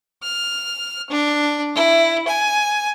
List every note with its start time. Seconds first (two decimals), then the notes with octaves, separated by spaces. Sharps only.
0.23 F6
1.10 D4
1.75 E4
2.27 G#5